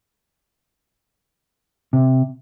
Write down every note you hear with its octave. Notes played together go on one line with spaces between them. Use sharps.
C3